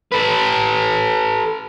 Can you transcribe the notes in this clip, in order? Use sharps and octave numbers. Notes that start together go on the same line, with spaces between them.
A4 B4